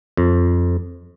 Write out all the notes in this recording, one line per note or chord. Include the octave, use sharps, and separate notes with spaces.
F2